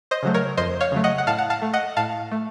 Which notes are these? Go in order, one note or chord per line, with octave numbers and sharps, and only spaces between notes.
C5 D#5
C#3 F#3 A3
A#4 C#5
F2 C5 D#5
C#5 F5
C#3 F#3 A3
D#5 F#5
F#5
A2 F5 A5
F#5
F5 A5
A3
D#5 F#5
A2 F5 A5
A3